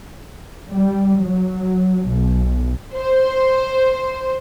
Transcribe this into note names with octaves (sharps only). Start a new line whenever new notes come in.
G3
F#3
B1
C5